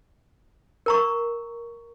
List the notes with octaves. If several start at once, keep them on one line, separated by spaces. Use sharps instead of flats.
A#4 A#5 C#6